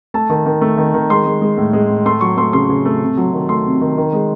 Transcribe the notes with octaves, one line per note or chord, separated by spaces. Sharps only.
A3 A5
D#3
D#3
A3
D#3
D#3
G#3 C6
G#3
G#3
A2
G#3
A2
A3 C6
F#3 C#6
A3 C6
C#3 C6
C#3
A3
C3
F#3
D#3
A3 C6
C3
D#3
D#3
G#3